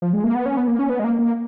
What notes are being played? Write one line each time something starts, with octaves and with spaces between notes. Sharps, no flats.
F3
G#3
A#3
B3
C#4
B3
A#3
C#4
B3
G#3
A#3
A#3